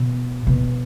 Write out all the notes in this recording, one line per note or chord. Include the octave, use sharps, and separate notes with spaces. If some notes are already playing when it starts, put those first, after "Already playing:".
Already playing: B2
B2